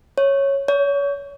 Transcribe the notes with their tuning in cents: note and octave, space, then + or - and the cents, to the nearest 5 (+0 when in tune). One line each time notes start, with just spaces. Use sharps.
C#5 -5
C#5 +30